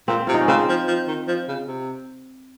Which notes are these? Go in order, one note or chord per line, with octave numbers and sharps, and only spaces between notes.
A#2 C4
C3 F4
D#4
C#4
C#3 C4
F3
F3
D#3
F3
C#3
C3